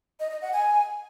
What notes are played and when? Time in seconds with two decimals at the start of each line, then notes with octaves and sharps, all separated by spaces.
0.20 D#5
0.31 D#5
0.42 F#5
0.53 G#5